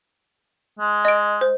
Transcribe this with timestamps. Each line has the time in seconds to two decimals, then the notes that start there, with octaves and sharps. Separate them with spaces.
0.79 G#3
1.05 D#5 D7
1.41 C5